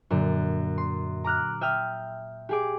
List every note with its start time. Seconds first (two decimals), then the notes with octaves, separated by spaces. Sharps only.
0.10 F#2 A#2 D3
0.78 C6
1.24 A#5 D6 F6 F#6
1.61 E5 G5 D#6 F6
2.49 G4 G#4 D6